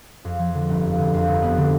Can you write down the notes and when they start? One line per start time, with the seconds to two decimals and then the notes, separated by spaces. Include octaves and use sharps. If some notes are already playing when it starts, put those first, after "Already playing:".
0.25 F2
0.39 F3
0.55 D3
0.69 G1
0.83 F2
0.98 D3
1.14 F2
1.28 G1
1.42 B3
1.57 D3